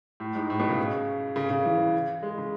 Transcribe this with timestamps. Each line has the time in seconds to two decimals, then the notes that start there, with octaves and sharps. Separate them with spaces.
0.20 A2
0.35 G#2
0.50 A2
0.60 B2
0.69 C#3
1.36 C#3
1.50 C#3
1.66 E3
2.22 G#3
2.38 C#3